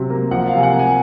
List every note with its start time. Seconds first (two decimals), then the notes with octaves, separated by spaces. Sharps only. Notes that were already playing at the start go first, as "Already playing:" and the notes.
Already playing: C3 F#3
0.10 A#3
0.31 F3 F#5
0.47 F5
0.53 C3 G#5
0.63 F#5
0.74 A#3
0.79 G#5